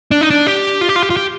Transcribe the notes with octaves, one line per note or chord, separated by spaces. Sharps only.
D4
D#4
D4
G4
F4
G4
F4
G4
F4
G4